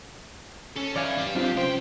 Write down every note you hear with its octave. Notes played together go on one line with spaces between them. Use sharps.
C#4 A4
E3 D5 F5 G#5
D4 G4 B4
F#2 C4 D4 F4 F5
C#4 F4 C5 G5